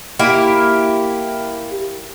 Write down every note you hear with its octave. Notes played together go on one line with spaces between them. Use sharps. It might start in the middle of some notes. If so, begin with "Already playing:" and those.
A#3 E4 G4